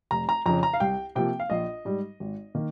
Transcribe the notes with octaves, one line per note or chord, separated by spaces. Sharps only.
F1 A#5
A#5
F2 C#3 A#5
A#5
F5
C2 G5
C3 F3 A#3 G5
F5
A#1 D#5
G#2 G3
G#1
D#3 A#3